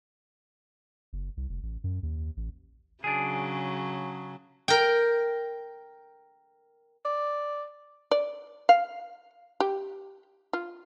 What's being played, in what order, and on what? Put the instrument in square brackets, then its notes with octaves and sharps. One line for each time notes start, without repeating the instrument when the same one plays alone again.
[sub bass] F#1
C2
F1
A1
F#2
D#2
A1
[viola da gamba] C#3 F#3 [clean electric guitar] D4 G#4
[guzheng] A#4 G5
[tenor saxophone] D5
[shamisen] D5
F5
G4
F4